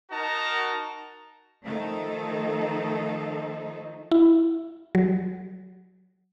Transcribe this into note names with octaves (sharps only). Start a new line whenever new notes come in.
D#4 F#4 A#4 A5 A#5
D#3 F3 A3 D#4 A4
E4
F#3